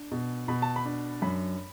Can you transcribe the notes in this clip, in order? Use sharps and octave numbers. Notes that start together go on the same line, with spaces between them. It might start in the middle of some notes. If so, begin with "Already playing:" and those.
Already playing: D4
B2
B2 B5
A5
B5
D4
F#2 B5